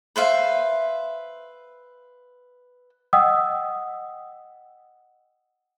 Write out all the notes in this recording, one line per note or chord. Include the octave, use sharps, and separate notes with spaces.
B4 C5 E5 F5
D#5 F#5 G5 D#6 E6